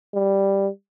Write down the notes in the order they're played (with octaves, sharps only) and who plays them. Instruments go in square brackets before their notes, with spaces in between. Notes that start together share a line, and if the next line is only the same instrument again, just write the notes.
[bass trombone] G3